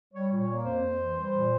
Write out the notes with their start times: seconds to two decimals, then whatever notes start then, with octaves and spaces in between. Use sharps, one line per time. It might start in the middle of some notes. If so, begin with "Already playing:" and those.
0.14 G3 C#5
0.31 A#2
0.40 C#5
0.48 A#3
0.64 F2 C5
0.82 F2
0.99 E3
1.16 G3
1.32 A#2